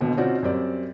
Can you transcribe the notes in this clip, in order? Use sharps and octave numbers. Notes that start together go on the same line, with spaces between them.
G#1 B2 D3
C4 C#4 D#4 F4 F#4 D5
F#2 G3 C4 D5